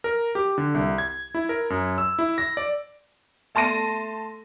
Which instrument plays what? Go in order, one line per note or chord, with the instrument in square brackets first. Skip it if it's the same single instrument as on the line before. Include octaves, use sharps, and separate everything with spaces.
[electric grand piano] A#4
G4
D3
C2
G#6
E4
A#4
F#2
E6
E4
A#6
D5
[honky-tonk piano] A3 A5 C6 A#6 D#7